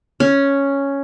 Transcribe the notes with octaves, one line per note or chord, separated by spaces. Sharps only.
C#4